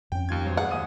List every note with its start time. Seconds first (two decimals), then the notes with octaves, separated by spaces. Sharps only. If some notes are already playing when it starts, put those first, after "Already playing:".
0.12 F2 C#4 G5
0.29 D#2 F4 G#6
0.45 G#1 B2 F#3 C5
0.57 G#4 F#5
0.71 D#2 D#6 D#7